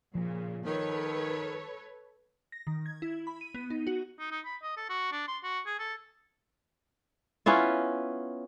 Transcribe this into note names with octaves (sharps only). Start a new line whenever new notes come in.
A#2 C#3 F3
D#3 A4 B4 C#5
A#6
D#3
G#6
E4
B5
D#7
B3
D#4
F#4
D#4
D#4
B5
D#5
A4
F#4
D4
C6
F#4
G#4
A4
B3 C#4 E4 F4